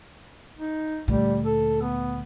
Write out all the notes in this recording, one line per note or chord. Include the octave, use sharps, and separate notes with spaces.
D#4
D2 A#2 G3
A4
B3